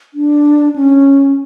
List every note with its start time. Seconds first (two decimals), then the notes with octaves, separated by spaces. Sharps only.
0.14 D4
0.76 C#4